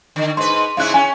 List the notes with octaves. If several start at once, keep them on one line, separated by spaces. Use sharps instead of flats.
D3
G#2 B4 C6
G#2 C#3 E4 F5 F#6
C#4 G#5